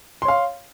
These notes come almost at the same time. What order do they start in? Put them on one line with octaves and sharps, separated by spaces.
C6 C#5 F5